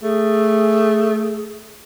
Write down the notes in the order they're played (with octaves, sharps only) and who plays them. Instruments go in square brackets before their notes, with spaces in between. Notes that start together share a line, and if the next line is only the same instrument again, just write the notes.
[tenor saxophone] A3 [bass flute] G#4